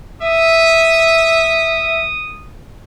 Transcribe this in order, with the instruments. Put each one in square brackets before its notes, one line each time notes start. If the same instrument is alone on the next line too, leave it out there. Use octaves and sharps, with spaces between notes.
[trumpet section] E5 [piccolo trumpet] D#6